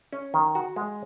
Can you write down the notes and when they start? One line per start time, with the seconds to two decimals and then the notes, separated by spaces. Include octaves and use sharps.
0.13 C#4
0.34 D#3
0.55 F#4
0.76 G#3